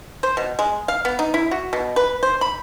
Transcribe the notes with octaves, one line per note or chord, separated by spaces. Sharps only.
C5
B2
G#3
F5
B3
D#4
E4
F#4
B2
B4
C5
B5